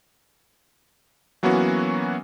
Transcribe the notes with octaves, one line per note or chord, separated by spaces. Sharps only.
E3 F#3 A#3 B3 C#4 F#4